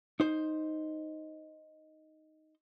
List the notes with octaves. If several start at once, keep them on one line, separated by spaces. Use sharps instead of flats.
D#4 C5